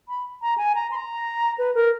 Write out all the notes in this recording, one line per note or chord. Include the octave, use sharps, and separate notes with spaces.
B5
A#5
G#5
A#5
C6
A#5
B4
A#4